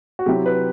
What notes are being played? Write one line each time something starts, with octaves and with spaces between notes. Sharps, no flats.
F#4
C3 F#3 C4 E4 G4
B4